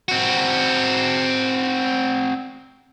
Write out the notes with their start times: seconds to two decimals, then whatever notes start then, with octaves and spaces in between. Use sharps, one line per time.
0.09 C4 F#4